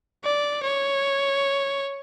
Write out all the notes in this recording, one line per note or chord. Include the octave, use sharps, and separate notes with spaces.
D5
C#5